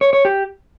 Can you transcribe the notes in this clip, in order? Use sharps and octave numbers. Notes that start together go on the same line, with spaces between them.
C#5
C#5
G4